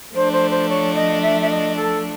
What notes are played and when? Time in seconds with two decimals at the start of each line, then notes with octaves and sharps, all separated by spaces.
0.14 F3 A3 D4 C5
0.32 C5
0.50 C5
0.68 C#5
0.94 D#5
1.22 E5
1.41 E5
1.49 D#5
1.76 A4